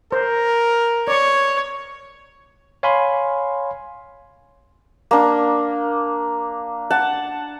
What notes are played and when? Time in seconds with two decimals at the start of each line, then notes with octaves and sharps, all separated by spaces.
0.12 A#4 C5
1.08 C#5 D5 C#6
2.83 C#5 F5 G#5 B5 C6
5.11 A#3 D4
6.90 F#5 A5